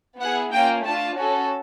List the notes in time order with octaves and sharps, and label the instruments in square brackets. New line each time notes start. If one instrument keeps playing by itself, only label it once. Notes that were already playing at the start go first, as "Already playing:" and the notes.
[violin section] B3 E4 G#4 F#5
A#3 C#4 F4 G5
A3 D4 F4 A5
C#4 F#4 A4